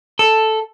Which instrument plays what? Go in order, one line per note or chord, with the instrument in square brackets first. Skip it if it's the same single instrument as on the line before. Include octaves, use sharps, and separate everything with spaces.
[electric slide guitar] A4